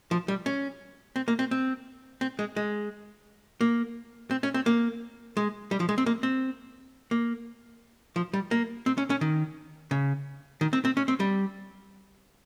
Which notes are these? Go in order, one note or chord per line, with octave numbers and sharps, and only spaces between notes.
F3
G3
C#4
C4
A#3
C4
C4
C4
G#3
G#3
A#3
C4
C#4
C4
A#3
G#3
G3
F3
G#3
C4
A#3
C4
A#3
F3
G3
A#3
C4
C#4
C#4
D#3
C#3
D#3
C4
C4
C#4
C4
G3